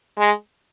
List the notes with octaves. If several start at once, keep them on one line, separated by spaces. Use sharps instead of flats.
G#3